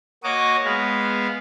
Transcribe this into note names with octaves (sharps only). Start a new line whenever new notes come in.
A#3 F#4 C#5 D#5 D6
G#3 B3 F5